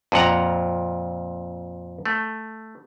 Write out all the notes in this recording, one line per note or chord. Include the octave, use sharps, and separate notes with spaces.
F2 A#2 F#5 A#5
A3